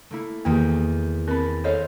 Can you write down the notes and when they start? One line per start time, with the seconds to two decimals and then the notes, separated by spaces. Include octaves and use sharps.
0.11 A3 A#3 E4
0.45 E2 D#3 A#3 G4
1.28 C4 A#4 B5 A6 A#6
1.64 A4 C5 C#5 D#5 F5